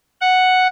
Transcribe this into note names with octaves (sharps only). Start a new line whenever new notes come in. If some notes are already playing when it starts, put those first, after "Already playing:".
F#5